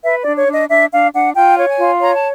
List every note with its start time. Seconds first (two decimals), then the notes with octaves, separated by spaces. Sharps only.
0.04 B4 E5
0.21 D4 D5
0.37 C#5
0.47 D4
0.53 D#5
0.69 D4 E5
0.91 D4 F5
1.14 D4 F#5
1.35 F4 G5
1.57 C#5
1.68 G#5
1.78 F4
2.00 C#5 A#5
2.13 A5